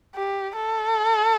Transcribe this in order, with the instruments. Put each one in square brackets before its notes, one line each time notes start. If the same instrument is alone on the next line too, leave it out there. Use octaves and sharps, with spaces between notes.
[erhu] G4
A4